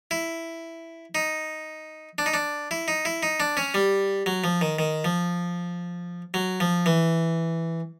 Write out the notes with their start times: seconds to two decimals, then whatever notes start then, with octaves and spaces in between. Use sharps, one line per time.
0.11 E4
1.15 D#4
2.18 D4
2.26 D#4
2.34 D4
2.71 E4
2.88 D#4
3.05 E4
3.23 D#4
3.40 D4
3.57 C#4
3.74 G3
4.26 F#3
4.44 F3
4.61 D#3
4.79 D#3
5.05 F3
6.34 F#3
6.60 F3
6.86 E3